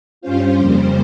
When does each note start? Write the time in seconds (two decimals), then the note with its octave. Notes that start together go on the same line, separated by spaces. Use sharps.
0.21 G2 G3 C#4 F4 C5
0.57 F2 C#3 G3 A#3 C5